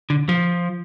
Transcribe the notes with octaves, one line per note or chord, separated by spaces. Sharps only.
D3
F3